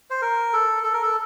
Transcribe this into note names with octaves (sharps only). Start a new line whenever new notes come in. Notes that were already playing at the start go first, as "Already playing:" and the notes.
C5
A#4
A4
A4
A#4
A4